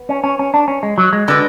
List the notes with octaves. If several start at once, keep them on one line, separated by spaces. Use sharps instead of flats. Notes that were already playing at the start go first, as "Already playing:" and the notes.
Already playing: B3
C#4
C#4
C#4
D4
C#4
G#3
F#3
G#3
D3 G#3 D4 F#4 B4